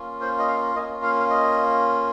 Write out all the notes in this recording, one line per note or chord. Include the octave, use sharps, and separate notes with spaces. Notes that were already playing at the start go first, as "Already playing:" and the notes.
Already playing: A#3 C#4 F4
C5
D#5
F5
A#3 C#4 F4 D#5
F5
F5
D#5